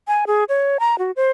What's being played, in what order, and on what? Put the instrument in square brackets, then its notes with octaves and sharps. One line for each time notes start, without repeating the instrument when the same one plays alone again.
[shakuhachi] G#5
G#4
C#5
A#5
F#4
C5